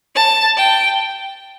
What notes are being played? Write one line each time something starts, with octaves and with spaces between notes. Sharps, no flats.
A5
G5